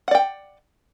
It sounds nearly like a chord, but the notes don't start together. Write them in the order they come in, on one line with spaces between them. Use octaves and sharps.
F#5 D5 G5